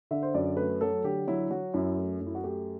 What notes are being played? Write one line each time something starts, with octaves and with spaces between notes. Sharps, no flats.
D3 E5
C5
F#2 D5
A3 B4
F#3 A4
D3 G4
F#3 E4
F#3 F#4
F#2 E4
A3
F#2
E4
F#4
A3 G4